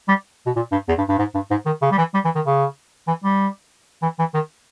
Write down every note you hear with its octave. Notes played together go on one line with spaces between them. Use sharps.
G3
B2
A#2
G2
E2
G2
G2
G#2
G2
G#2
D#3
C#3
G3
E3
G3
E3
D#3
C#3
E3
G3
E3
E3
D#3